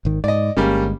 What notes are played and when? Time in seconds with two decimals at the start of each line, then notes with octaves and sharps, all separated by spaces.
0.05 G#1 D#3
0.24 G#2 D5 D#5
0.57 G1 G3 G#3 A#3 C#4